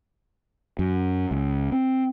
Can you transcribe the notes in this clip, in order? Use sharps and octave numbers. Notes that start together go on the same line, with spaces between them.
F#2
C#2
C4